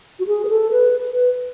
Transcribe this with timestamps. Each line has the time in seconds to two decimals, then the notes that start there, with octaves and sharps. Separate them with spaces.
0.19 F#4
0.27 G#4
0.45 B4
0.49 A4
0.71 B4
1.12 B4